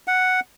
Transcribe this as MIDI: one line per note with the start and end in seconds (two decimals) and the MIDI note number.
0.08 0.40 78